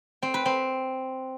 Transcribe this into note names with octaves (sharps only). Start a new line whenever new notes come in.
C4
B4
C4